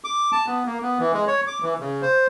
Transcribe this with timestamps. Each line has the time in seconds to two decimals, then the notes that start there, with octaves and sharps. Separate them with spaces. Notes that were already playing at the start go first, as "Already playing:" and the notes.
0.04 D6
0.32 A5
0.46 B3
0.66 A#3
0.82 B3
0.99 E3
1.13 G#3
1.27 C#5
1.47 D6
1.62 E3
1.80 C#3
2.02 C5